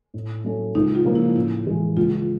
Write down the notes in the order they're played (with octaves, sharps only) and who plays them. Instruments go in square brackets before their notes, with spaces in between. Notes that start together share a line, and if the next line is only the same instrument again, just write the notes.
[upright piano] A2
F#3 A3 C#4
[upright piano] C#2 [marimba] D#4
[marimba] F4
[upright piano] C#3 F3 A#3
[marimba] E4
[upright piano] A2 [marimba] E4
[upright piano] E3 G#3
[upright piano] C#2 [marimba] F4